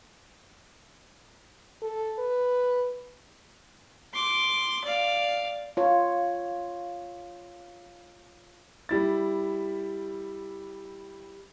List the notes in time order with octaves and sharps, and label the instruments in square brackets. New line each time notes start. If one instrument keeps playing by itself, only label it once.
[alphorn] A4
B4
[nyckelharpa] C6 D6
D5 F5
[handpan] F4 C#5
[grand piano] G3 E4 A6